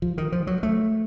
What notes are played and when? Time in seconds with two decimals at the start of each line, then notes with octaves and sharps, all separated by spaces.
0.02 F3
0.18 D#3
0.32 F3
0.47 F#3
0.63 A3